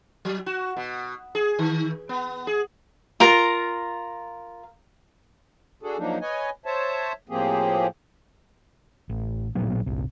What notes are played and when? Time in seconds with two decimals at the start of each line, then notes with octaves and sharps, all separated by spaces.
0.25 F#3
0.46 F#4
0.77 B2
1.35 G#4
1.59 D#3
2.09 B3
2.47 G#4
3.20 F4 A#4 A#5
5.83 D4 F#4 G#4 A4
5.98 F3 F#3 A#3 D4 D#4
6.22 B4 C#5 D#5 G#5
6.66 C5 C#5 E5 A5
7.29 A2 F3 A#3 C4 G4 G#4
9.09 A1
9.55 A1 A#2 F#3 B3
9.86 G1 C2 C3